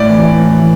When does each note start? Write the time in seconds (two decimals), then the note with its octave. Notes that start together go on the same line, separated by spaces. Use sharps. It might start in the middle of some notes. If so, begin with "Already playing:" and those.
Already playing: A2 D5
0.09 E3
0.23 E3
0.38 A2
0.53 E3